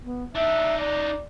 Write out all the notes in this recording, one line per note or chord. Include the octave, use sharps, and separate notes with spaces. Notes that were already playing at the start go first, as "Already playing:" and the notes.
B3
D4 D#4 E5
D5